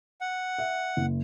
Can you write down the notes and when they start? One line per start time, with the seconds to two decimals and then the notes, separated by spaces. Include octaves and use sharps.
0.21 F#5
0.58 E5
0.97 F#1